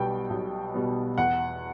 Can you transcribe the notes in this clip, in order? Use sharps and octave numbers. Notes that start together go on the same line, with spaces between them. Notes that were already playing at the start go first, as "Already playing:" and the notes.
Already playing: B1 B2 G3 B3 G5
B1
B2 G3 B3
E2 F#5